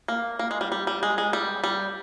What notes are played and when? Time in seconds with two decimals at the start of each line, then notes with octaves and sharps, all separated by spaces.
0.08 A#3
0.39 A#3
0.51 G#3
0.61 G3
0.72 G3
0.87 G3
1.03 G#3
1.18 G#3
1.33 G3
1.64 G3